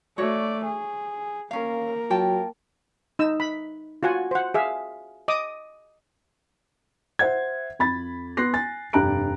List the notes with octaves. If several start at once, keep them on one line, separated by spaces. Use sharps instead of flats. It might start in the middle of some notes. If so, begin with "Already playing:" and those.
A3 F#4 C#5 D5
G#4
A#3 C#4 A#4 F5
F#3 F4 G5 A5
D#4 E6
B5
F4 F#4 F#5 G#5
C5 F#5
G#4 E5 F5
D#5 D6 D#6
C5 E5 F#5 G#6
F2 B5 A6
B3 C6 F#6 A#6 C7
G#5 A6
F1 G2 G4 A#5 F#6 D7